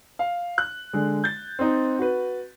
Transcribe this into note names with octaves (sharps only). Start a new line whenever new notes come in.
F5
F#6
D3 G#3
G6 A6
C4 D#4
F#4 B4